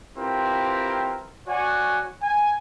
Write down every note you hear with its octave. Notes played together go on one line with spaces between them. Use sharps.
C4 E4 F4 G4 A#4 B4
F#4 C#5 D5 F#5 G#5
G#5